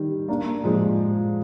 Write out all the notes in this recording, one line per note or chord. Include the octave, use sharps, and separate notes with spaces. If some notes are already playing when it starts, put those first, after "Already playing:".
Already playing: D#3 G3
A#3 D4
F3 G#3